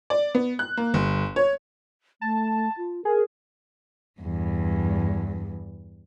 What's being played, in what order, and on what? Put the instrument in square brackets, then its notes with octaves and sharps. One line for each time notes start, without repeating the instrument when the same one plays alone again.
[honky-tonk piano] D5
B3
F#6
A#3
G1
C#5
[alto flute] A3 [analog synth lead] A5
[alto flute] F4
[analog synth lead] G#4 [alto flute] A#4
[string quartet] E2 G2